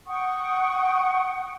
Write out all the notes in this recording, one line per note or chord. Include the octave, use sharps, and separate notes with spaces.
F#5 G5 C#6 D#6